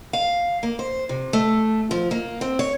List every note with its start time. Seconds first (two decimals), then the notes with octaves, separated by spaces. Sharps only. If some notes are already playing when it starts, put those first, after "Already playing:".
0.13 F5
0.63 A#3
0.79 C5
1.09 C3
1.33 A3
1.91 F3
2.11 A#3
2.41 C4
2.59 C#5